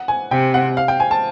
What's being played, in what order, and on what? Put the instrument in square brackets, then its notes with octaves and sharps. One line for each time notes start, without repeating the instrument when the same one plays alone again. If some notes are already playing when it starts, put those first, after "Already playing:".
Already playing: [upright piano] F#5
G#5
[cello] C3 [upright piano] G5
[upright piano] F#5
F5
G5
G#5
A5